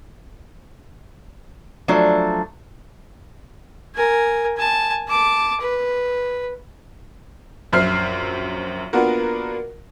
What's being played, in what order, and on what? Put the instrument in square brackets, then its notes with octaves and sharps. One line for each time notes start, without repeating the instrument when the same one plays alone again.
[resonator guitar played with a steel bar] F3 F#3 A3 D4
[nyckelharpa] A#4 G#5
G#5 A5
A5 D6
B4
[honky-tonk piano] A#1 F#2 C5 E5 F6 C7
A#3 B3 D4 F4 F#4 A#4